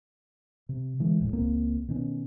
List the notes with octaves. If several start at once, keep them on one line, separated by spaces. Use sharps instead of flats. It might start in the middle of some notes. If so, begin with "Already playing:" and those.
C3
D3 E3 G#3
E1 A2
C#2 A#3 C4
B2 D#3 C#4